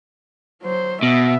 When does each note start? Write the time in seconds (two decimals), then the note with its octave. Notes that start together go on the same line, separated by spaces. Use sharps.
0.62 F#3 C5
1.03 B2 B3 E5